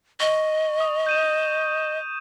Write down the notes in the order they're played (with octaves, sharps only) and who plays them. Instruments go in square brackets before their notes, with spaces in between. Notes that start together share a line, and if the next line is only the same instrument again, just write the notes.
[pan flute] D#5 [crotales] C#6
[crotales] D#6
G6 D#7 E7